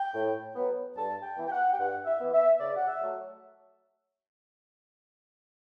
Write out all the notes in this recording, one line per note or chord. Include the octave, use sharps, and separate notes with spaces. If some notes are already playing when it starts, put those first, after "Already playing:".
Already playing: G5
A2
F#3 B3
G2 A5
G5
E3 B3
G5
F#5
G5
G2 F#5
E5
E3 B3
E5
C#3 D5
F#5
E5
F#3 A3